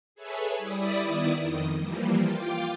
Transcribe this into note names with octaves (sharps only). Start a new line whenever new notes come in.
G#4 A4 B4 C#5 E5 G#5
G3 E4 D5 B5 D#6
D#3 B3 E4 D5 D#6
F2 D#3 D#5
E3 F3 G3 A#3
F4 G5 D6